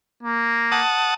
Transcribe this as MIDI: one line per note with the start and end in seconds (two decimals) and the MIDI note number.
0.23 0.80 58
0.72 1.14 78
0.72 1.14 81
0.72 1.14 87